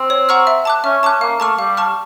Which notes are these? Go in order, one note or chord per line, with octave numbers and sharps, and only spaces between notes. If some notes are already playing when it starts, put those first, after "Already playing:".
Already playing: C4
C#5
F#5 A#5 C#6 F6
E5
A5 D6 F#6
C#4 E5
C#4 A5 D6 F#6
A#3 F5
A3 A5 C#6 F6
G3 F5
A5 C#6 F6